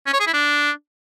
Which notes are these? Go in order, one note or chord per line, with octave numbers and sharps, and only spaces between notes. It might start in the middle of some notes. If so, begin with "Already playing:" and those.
C#4
C#5
G#4
E4
D4